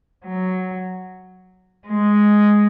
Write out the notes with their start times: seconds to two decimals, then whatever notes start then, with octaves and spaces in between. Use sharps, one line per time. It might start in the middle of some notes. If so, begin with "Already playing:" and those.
0.26 F#3
1.87 G#3